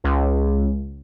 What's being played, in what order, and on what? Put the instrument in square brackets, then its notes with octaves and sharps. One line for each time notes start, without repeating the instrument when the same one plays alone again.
[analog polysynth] C#2